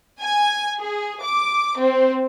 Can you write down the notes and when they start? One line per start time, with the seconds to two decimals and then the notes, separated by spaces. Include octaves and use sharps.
0.20 G#5
0.79 G#4
1.23 D6
1.78 C4